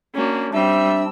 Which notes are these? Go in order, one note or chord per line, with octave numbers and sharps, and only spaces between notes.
A#3 C#4 D4 F#4
G3 C4 D4 E5 E6